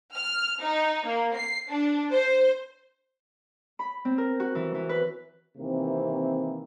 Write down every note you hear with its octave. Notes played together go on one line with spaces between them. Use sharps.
F6
D#4
A#3
C7
D4
C5
B5
C4
A#4
F#4
E3
E3
B4
C3 D#3 E3 A#3 C4